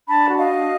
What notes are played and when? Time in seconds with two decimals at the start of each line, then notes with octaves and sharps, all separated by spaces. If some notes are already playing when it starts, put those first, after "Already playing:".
0.08 D4 A5 B5
0.29 F#4
0.38 D#5 F5
0.49 D4